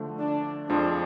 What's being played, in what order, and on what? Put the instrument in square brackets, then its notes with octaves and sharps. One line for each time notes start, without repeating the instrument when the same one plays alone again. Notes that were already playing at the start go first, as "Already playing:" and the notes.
Already playing: [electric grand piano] D3 F3 A3
[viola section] D4
[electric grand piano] F2 F3 G#3 [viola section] D4